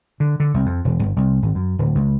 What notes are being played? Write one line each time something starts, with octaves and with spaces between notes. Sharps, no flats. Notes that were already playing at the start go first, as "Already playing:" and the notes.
D3
D3
C2
F2
E1
G1
C2
G#1
F#2
D1
C#2